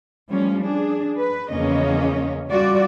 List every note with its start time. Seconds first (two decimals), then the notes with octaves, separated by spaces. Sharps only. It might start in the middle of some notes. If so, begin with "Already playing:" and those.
0.28 F3 G3 A3 C#4
0.62 D4 G#4
1.18 B4
1.51 E2 C#3 F3 A#3 C#4 D#5
2.49 G3 F4 F#4 D5